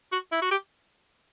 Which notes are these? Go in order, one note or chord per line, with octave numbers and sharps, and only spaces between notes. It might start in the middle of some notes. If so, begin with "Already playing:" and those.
F#4
E4
F#4
G4